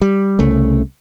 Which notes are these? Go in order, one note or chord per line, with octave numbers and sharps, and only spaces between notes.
G3
C2 C#3 A3